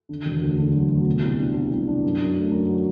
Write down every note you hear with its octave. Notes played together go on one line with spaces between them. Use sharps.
D3
E1
D2
D3
F#3
D2
B2
C2
D4
C2
C2
D4
F#2
F#2
A3
F#2
F#3